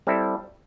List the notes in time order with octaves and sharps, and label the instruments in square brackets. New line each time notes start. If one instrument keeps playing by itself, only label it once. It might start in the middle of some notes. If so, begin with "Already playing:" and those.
[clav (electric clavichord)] G3 C4 E4 A4